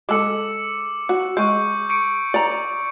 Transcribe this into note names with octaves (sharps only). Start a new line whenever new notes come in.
G#3 A4 D6 E6 C#7
F#4
G#3 C#6 G6
C#6 C#7 D7
D5 A#5